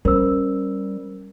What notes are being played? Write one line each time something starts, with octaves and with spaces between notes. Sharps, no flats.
G3 C#4 A#4 C5 E6